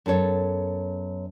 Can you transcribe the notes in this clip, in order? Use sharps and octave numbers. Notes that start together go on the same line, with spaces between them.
F#2 B3 A4 C#5